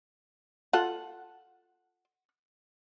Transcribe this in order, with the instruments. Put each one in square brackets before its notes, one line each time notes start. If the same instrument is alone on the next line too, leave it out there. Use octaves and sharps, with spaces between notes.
[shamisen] F4 A4 [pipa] F#5